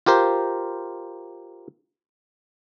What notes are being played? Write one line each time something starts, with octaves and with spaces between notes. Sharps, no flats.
F4 G4 A#4 C5